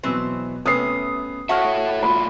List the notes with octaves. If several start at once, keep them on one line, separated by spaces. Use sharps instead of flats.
B2 E3 F#3 B3 C4 C5
C3 A3 B3 C#4 D#6 C7
F#4 A4 C#5 E5 F#5 A5 F6 A#6
A2 F4 B5